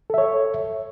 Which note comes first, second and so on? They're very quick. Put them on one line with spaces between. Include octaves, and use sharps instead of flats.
A4 E5 C#5